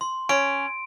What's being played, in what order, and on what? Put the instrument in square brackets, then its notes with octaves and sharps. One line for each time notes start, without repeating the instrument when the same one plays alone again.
[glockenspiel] C6
[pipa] C#4 [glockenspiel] D7